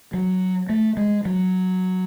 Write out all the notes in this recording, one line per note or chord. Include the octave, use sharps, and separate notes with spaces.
F#3
A3
G#3
F#3